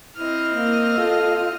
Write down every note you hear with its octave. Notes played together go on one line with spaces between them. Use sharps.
C4 E4 D#5 F6
A#3
F4 A4